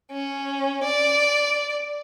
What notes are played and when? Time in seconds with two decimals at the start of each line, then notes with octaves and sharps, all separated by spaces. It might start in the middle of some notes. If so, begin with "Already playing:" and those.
0.11 C#4
0.84 D5